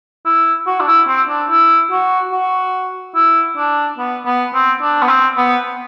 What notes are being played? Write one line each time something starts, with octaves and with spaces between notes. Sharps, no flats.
E4
F#4
D4
E4
C4
D4
E4
F#4
F#4
E4
D4
B3
B3
C4
D4
B3
C4
B3